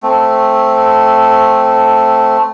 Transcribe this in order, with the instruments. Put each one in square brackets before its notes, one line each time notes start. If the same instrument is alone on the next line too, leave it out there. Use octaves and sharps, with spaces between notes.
[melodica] A3 C4